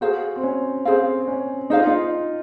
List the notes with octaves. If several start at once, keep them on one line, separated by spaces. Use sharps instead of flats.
F#4 G#4 C5 F5
C4
C#4
C4 G#4 C5 F5
C#4
D#4 G#4 C5 F5
F4
D#4